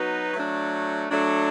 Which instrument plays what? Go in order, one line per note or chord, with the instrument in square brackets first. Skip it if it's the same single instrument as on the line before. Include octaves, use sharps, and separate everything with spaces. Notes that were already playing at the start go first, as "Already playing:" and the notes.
Already playing: [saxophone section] F#3 B3 D#4 F#4 B4
F#3 A3 D4
F#3 A3 D4